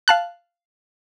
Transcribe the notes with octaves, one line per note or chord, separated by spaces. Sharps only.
F5 A5 F#6